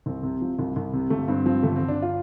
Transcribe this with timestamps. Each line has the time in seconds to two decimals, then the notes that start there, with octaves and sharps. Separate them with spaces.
0.06 C2 C4
0.23 C3
0.41 F3
0.59 C2
0.76 C2
0.93 C3
1.10 G1 A3
1.28 G2 C4
1.46 F3 C4
1.63 G1 A3
1.76 G1 C4
1.88 D4
2.02 F4